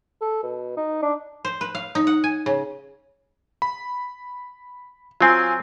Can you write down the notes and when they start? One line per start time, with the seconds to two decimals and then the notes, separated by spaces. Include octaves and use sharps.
0.22 A4
0.43 B2
0.77 D#4
1.03 D4
1.45 C5
1.61 B4
1.75 F5
1.95 D#4
2.07 F#5
2.24 G#5
2.46 C#3
3.62 B5
5.20 F#3 C4 F4 G#5